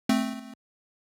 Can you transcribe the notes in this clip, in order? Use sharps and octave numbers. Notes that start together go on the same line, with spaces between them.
A3 C4